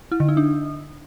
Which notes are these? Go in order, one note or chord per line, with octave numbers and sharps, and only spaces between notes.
E4
D3
D#4
D4